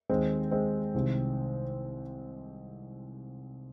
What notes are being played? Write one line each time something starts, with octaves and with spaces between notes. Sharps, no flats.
D#2 D#3 G#3 C4
G#3 C4
C2 C3 D#3